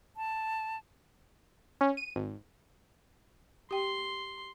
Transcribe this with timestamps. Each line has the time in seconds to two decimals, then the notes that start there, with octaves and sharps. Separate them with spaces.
0.17 A5
1.81 C#4
1.97 D#7
2.16 G#1
3.71 G4 G5 C6